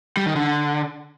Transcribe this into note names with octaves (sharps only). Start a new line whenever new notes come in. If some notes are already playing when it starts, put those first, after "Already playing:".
G3
D#3
D3